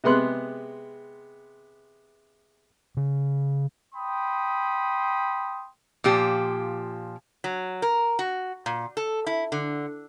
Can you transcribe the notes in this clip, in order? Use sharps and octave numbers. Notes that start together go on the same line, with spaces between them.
C3 G#3 B3 C6 F#6
C#3
G5 B5 C6 D#6
A#2 F3 G4
F#3
A#4
F#4
A#2
A4
E4
D3